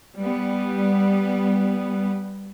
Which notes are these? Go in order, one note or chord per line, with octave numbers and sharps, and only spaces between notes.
G3 B3